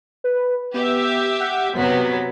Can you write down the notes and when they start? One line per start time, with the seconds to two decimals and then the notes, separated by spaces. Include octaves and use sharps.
0.24 B4
0.74 B3 G4 E5
1.41 F#5
1.75 C3 F#3 B3 B6